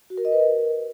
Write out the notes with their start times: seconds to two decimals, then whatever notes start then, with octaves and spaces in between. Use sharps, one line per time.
0.10 F#4
0.17 A#4
0.25 D#5
0.32 B4
0.40 A#4